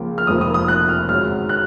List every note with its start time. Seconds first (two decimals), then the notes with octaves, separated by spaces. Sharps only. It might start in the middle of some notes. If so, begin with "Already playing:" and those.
Already playing: C#2 C#3 F3 A#3
0.18 F6
0.27 F1 F2 F3 A#3 D#6
0.41 D#6
0.54 D#6
0.68 F#6
0.89 F6
1.09 G#1 F#2 C#3 F#3 F6
1.49 F#6